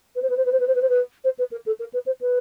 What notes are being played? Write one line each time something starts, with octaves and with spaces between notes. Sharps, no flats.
B4
C5
B4
C5
B4
C5
B4
C5
B4
C5
B4
C5
B4
A#4
A4
A#4
B4
C5
B4